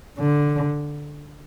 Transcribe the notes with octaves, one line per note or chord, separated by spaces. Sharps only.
D3